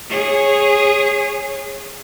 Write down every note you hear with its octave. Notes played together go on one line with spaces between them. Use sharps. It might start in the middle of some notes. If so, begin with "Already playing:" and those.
G#4 C#5